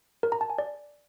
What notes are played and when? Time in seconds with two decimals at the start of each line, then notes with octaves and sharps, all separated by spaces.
0.23 A#4
0.32 A#5
0.41 A5
0.50 G#5
0.59 D5